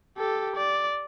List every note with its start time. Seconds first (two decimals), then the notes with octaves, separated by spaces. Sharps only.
0.17 G4 A4
0.56 D5